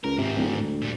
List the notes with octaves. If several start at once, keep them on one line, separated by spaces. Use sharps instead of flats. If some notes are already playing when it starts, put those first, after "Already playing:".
C#2 A#4
G#2 C3 C4
D1
D2
A#2 G3